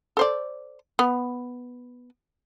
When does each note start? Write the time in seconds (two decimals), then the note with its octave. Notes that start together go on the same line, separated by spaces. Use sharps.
0.17 A4 C5 D5
0.99 B3